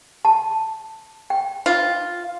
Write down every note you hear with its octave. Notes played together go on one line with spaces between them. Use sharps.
A5
G5
F4